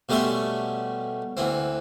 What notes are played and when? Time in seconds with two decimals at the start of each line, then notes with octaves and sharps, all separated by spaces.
0.09 B2 G3 A3 C#4 E5 C6
1.37 D2 E3 C4